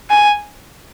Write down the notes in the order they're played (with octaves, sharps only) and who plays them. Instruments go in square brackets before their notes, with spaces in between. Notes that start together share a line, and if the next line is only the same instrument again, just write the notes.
[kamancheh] G#5